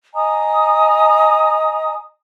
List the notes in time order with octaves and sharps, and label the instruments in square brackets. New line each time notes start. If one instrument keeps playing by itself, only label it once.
[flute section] D#5 G#5 A#5 D#6